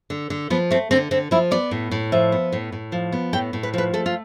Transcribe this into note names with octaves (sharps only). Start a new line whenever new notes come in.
D3
D3
F3 B3
A3 C4
D3 C4
D3 C4
F3 E4
B3 D5
A2
A2
F3 E5
B3
A2
A2
F3
B3
A2 G5
A2
B4
F3 B4
A3 A4
F4